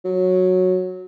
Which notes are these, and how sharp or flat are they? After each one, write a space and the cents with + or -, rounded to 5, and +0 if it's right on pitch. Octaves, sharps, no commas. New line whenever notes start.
F#3 -10